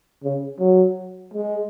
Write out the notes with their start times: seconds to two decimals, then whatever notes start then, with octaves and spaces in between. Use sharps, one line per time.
0.24 C#3
0.60 F#3
1.34 G#3